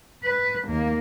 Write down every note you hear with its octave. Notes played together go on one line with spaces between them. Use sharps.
B4
D#2 A#3